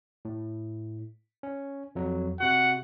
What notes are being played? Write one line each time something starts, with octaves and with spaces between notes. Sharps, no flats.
A2
C#4
F2 F#3
C3 F#4 F#5